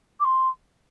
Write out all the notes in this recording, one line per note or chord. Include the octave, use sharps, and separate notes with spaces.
D6
C6